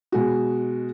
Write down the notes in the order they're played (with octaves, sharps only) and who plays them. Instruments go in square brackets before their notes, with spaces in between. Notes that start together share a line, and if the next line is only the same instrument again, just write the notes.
[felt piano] B2 G#3 F#4